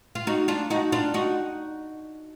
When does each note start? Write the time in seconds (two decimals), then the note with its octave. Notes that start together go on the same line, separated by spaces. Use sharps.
0.15 F4
0.27 D#4 F#4
0.48 D4 F4
0.70 D#4 F#4
0.92 D4 F4
1.14 D#4 F#4